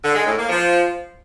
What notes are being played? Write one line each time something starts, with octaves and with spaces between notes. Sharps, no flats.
D3
G#3
A2
A#3
F3